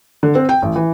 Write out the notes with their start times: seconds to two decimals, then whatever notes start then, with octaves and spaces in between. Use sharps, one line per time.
0.23 D3
0.35 C4
0.49 G5
0.62 A1
0.76 E3